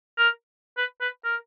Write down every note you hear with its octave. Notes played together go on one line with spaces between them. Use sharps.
A#4
B4
B4
A#4